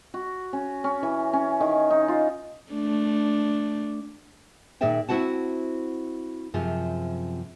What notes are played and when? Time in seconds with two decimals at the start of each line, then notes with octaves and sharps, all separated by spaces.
0.14 F#4
0.53 C#4
0.84 C#4
1.03 E3
1.33 C#4
1.60 D#3
1.90 D#4
2.08 F4
2.73 A3 D4
4.81 A#2 D#3 G#4 D5 E5 G5
5.09 C4 E4 F#4 F#5 A5
6.54 F#2 C3 F3 F4 G#4